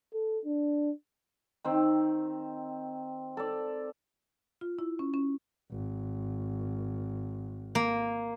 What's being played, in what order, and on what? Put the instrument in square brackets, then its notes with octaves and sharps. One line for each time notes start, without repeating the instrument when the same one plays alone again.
[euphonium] A4
D4
[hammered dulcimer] D#3 C4
A4 D5
[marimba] F4
E4
C#4
C#4
[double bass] G#1
[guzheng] A#3